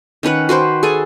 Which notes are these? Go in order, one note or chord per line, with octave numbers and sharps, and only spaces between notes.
D#3 C#4 B4 F#5
F#4 B4 C5 G5
G#4 A4 G#5